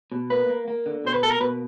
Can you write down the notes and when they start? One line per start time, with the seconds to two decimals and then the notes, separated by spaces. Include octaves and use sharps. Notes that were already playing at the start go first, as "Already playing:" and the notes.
0.12 B2
0.30 A#3 B4
0.49 A#3
0.68 A#3
0.86 D3
1.04 B2 C5
1.13 B4
1.23 A#3 A4
1.31 A#4
1.40 B2 B4